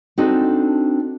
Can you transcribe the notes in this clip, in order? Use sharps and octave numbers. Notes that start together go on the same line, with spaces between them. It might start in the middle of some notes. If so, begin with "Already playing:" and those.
C4 D4 D#4 F#4 A4